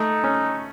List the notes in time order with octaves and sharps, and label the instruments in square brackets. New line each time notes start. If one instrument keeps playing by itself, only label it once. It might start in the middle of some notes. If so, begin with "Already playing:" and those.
Already playing: [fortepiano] A3 [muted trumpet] D#4
[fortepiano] C#4